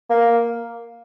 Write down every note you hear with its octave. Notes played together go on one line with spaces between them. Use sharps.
A#3